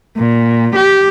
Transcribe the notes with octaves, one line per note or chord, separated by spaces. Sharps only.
A#2
G4